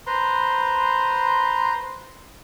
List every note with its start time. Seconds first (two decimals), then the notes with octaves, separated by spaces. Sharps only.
0.07 B4 C5 A#5 C6